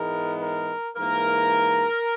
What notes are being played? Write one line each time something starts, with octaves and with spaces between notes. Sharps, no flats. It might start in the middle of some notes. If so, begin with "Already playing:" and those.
Already playing: G#2 E3 G#3 B3 A#4
A#4
G#2 E3 A#3 A#4